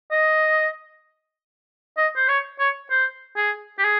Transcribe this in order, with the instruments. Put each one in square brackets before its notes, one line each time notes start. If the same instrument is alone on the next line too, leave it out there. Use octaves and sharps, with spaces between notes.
[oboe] D#5
D#5
C5
C#5
C#5
C5
G#4
G4
G#4